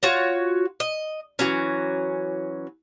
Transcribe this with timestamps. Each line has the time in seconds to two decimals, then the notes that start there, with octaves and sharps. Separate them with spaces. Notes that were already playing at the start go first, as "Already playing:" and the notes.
0.03 F4 F#4 C#5
0.80 D#5
1.39 E3 F#3 C#4